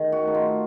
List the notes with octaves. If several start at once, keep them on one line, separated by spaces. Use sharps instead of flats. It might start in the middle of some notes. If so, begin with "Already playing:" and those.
Already playing: D#3
F#4
A3 D#4
F4